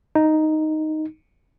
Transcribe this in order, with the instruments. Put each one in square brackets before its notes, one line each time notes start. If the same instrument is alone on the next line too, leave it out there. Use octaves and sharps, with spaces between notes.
[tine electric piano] D#4